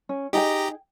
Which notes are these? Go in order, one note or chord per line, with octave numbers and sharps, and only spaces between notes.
C#4
D#4 G4 G#4 D#5 G5 A#5